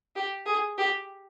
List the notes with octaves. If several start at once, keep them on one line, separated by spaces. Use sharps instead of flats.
G4
G#4
G4